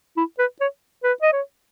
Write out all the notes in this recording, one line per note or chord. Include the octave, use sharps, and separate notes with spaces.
E4
B4
C#5
B4
D#5
C#5